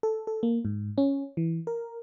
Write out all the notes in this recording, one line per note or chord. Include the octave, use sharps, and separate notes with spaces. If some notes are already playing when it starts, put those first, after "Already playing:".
A4
A4
A#3
G#2
C#4
E3
A#4